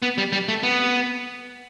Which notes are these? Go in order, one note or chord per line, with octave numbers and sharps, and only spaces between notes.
B3
G3
G3
A3
B3